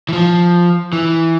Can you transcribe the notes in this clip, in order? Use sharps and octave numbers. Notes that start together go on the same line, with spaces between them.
E3
F3
E3